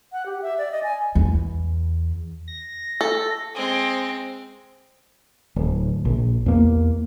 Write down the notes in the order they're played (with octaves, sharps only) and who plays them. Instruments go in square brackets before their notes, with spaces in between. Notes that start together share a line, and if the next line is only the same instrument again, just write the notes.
[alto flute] F#5
G4
E5
D5
D#5
G#5
[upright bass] E2
[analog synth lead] A#6
[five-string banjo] A4
[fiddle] G#3 C4
[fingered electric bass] D1
A#1
E2 A#3